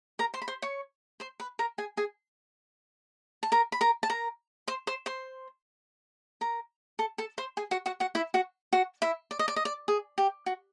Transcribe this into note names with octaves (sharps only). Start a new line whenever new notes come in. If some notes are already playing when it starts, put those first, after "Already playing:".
A#4 A#5
C5 C6
B5
C5 C6
C#5 C#6
C5 C6
B4 B5
A#4 A#5
G#4 G#5
G#4 G#5
A5
A#4 A#5
B5
A#4 A#5
A5
A#4 A#5
C5 C6
C5 C6
C5 C6
A#4 A#5
A4 A5
A4 A5
C5 C6
G#4 G#5
F#4 F#5
F#4 F#5
F#4 F#5
E4 E5
F#4 F#5
F#4 F#5
E4 E5
D5
D#5
D5
D#5
D5
G#4
G4
F#4